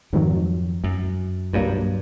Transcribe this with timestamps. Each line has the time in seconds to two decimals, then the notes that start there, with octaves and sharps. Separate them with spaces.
0.13 F2 G#2 D#3 F#3
0.84 F#2
1.53 C2 G2 A#2 F#3 A#3